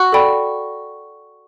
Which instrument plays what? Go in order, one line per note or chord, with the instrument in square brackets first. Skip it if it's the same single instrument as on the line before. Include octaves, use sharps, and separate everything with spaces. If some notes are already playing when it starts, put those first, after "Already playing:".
Already playing: [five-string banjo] F#4
[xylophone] A4 D5 G5 B5